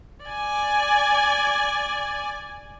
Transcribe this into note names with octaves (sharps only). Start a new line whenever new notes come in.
D5 G#5